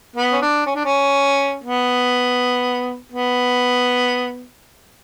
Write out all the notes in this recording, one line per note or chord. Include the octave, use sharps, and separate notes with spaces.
B3
C#4
D4
C#4
D4
C#4
B3
B3